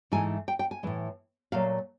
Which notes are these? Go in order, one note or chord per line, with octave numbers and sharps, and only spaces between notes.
G#2 E3 A3 G#5
G5
G5
G#5
A2 E3 G#3
A#2 F#3 A3 F5